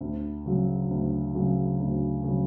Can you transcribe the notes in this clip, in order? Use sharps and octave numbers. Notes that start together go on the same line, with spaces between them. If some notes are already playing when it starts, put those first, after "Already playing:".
D2
C#3 F#3
D2
C#3 F#3
D2
C#3 F#3